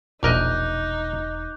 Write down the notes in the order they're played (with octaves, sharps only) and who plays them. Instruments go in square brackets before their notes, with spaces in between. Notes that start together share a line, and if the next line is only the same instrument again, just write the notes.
[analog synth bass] E1 [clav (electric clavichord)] A#1 A#4 D#5 [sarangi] D#4 [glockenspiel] D6 F#6 G6